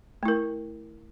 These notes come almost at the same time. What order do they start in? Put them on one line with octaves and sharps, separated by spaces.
A3 E4 A#4